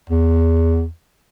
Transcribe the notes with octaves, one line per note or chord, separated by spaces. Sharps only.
E2